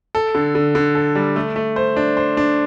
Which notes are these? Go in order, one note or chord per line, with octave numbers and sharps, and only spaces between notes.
A4
D3
D3
D3
A4
G3
A3
A3
C5
D4
C5
D4